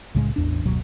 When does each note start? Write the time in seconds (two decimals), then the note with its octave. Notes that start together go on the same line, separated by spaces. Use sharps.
0.15 C2 A2 C#3 G#3
0.36 A1 E2 D4
0.65 F#1 D2 B2 F#3